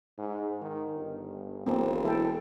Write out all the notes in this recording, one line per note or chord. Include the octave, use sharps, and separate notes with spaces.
G#2
D#3
G1
E1 B1 A#3 C4
E3 E4 A4 G5